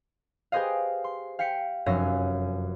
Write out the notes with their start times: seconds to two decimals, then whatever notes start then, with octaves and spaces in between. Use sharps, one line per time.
0.52 G4 G#4 B4 C5 D#5 F5
1.04 C6
1.39 F5 G5 B6 C#7
1.86 F1 F#2 C#4 E5 F5 A#6